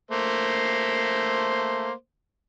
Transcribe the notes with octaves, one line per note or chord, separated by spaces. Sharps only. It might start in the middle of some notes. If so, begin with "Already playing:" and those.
A3 A#3 C5